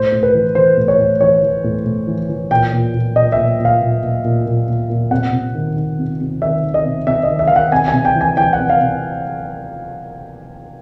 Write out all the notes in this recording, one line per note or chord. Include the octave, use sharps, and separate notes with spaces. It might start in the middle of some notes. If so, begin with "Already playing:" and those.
Already playing: A2 C5
A2
B4
E3
E3 C5
A2
C#5
A2
E3 C#5
E3
A2
A2
E3
E3
A#2 G5
A#2
A#2
A#2 D#5
A#2 E5
A#2
F5
A#2
A#2
A#2
A#2
A#2
A#2
C3 F#5
C3
D#3
D#3
C3
C3
D#3 E5
D#3
D#5
C3
C3 E5
D#5
D#3
E5
D#3 F5
F#5
C3 G#5
G#5
C3
G5
E3
G#5
E3 G5
F#5
C3
F5
C3